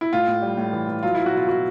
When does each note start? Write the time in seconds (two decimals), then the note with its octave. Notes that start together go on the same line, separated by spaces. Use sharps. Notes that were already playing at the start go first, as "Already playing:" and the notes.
0.01 E4
0.13 A2 F4
0.27 A2
0.42 G3
0.57 A2
0.73 E3
0.88 E3
1.03 F#3 F4
1.15 F#3 E4
1.26 F#4
1.33 B2 F4
1.48 B2 F#4